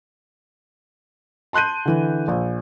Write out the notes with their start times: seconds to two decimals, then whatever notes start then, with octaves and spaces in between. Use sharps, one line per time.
1.53 A5 C6 F#6 G6 D#7
1.86 D3 E3
2.28 A#1